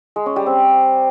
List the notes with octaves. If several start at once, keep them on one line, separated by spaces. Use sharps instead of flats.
G#3
C#4
G3
C4